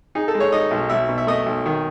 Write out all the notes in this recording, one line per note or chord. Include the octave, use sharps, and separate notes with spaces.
D#4 G#4
A4
G#3
C#5
D#4 D#5
B1
B1 E5
B2
E5
A3 D#5
B1
D#3